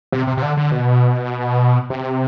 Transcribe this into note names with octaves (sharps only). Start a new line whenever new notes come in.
C3
C3
C3
D3
D3
B2
C3